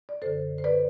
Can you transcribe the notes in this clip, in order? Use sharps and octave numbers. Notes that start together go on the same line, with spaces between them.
D5
F#2 D3 A4 C5
C5
B4 D5